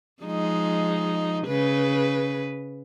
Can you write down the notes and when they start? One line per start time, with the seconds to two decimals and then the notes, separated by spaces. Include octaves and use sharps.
0.23 F3 G#3 D#4
1.46 C#3 B4